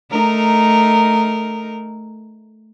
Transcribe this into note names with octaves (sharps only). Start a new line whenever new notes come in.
A3 D#4 A#4